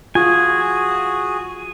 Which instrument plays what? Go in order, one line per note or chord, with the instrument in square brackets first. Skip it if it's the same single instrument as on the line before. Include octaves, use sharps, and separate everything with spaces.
[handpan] F4 [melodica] F#4 G#4 [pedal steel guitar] G#5